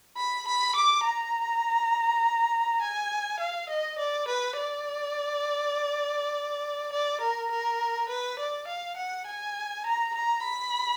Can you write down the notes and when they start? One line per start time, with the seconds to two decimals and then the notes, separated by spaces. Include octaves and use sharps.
0.17 B5
0.47 B5
0.76 D6
1.05 A#5
2.82 G#5
3.40 F5
3.69 D#5
3.98 D5
4.28 B4
4.57 D5
6.92 D5
7.21 A#4
7.51 A#4
8.09 B4
8.39 D5
8.68 F5
8.97 F#5
9.27 G#5
9.86 A#5
10.14 A#5
10.44 B5